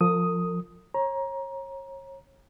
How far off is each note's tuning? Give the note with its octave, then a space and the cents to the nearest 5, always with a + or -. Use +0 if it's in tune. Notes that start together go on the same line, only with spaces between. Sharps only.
F3 +5 A#4 -45 D#6 +5
C#5 -30 A#5 +20